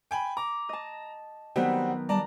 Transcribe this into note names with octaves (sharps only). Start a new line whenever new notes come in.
G5 G#5 B5
A#5 D6
D#5 A5
D#3 F#3 G3 B3 C4 F#5
G3 D5 A5 A#5